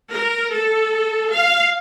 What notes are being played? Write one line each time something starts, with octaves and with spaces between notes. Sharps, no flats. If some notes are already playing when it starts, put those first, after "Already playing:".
A#4
A4
F5